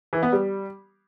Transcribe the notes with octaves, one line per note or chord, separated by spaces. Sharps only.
E3
B3
G3